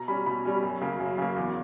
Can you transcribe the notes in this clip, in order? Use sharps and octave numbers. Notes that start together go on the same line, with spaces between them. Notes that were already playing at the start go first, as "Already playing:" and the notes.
Already playing: B2 A#5
G3 C#4 B5
B2 B5
G3 C#4
F#2
C#3 F#3 A#3
F#2
C#3 F#3 A#3
E2